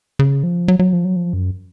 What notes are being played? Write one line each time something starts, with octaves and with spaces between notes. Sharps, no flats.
C#3
F3
F#3
F#3
F3
F#3
F3
F#2